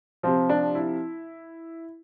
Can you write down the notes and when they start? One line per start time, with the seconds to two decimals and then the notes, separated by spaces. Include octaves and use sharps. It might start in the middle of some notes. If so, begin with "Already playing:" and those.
0.23 C3 F3 C4
0.49 D4
0.75 E4